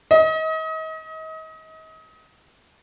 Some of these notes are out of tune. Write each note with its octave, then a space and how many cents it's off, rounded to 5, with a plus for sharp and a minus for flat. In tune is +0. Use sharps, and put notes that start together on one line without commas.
D#5 +35